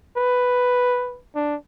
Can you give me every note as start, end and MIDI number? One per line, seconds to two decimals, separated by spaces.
0.17 1.19 71
1.35 1.56 62